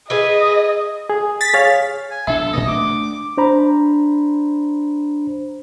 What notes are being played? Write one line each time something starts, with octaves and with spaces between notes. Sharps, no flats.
G#4 B4 D#5 E5
G#4
A6 B6
G#4 C#5 F5
G#5
B1 D4 A4 E5
D#1 A2 D#5
A3 C4 D4 D6
D4 C5 A#5 B5